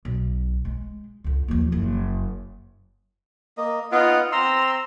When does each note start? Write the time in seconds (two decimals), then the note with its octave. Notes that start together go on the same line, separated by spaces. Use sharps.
0.05 B1
0.65 G#3
1.24 C#2 D3
1.48 D#2 F3
1.72 F#1
3.57 A#3 D#5
3.92 B3 D#4 F4 D#5 F#5
4.32 C4 A#5 C6 E6